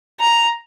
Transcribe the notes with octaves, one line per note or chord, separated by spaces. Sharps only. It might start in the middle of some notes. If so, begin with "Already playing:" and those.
A#5